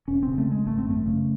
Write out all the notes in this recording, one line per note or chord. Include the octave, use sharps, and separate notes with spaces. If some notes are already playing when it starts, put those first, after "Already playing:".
E1 C#4
C4
C#3
A3
C#3 G#3
G#1 A3
C4
F#2 A3
C#3